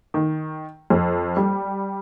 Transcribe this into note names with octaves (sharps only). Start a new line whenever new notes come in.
D#3
F2
G3